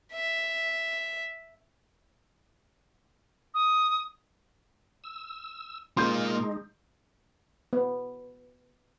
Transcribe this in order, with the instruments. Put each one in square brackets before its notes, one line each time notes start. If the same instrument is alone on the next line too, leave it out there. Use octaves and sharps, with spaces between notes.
[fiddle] E5
[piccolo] D#6
[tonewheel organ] E6
[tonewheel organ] G#3 D#4 [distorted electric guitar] A#3 F4 [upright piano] C6 G6
[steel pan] B3